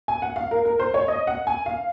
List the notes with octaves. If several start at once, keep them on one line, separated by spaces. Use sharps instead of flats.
G#5
F#5
F5
A#4
A#4
C5
C#5
D#5
F#5
G#5
F5